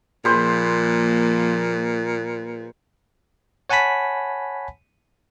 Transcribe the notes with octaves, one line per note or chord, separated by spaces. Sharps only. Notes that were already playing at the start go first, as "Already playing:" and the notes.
A#2 F3 A#3 G#4 B4 C5
C#5 F#5 G#5 A5 B5 B6